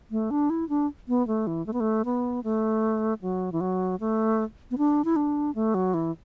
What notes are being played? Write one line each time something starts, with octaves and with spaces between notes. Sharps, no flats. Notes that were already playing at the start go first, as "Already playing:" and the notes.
A3
D4
E4
D4
B3
A3
E3
A3
B3
A3
B3
A3
F#3
E3
F#3
A3
B3
D4
E4
D4
A3
F#3
E3